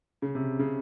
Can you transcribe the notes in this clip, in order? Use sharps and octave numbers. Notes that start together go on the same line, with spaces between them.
C#3
C3
C#3